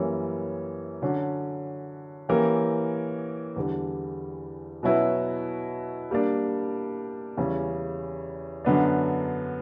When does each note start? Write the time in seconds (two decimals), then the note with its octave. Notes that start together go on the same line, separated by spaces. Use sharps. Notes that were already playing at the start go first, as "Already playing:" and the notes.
Already playing: F#2 E3 G3 A#3 C#4
1.02 D3 F#3 C#4
2.29 E3 A#3 C#4 G4 A#4
3.56 E2 D3 G3
4.83 B2 F#3 C#4 E4 B4
6.11 G3 A#3 D4
7.37 E2 C#3 G3 C#4
8.65 F#2 D3 F#3 B3 D4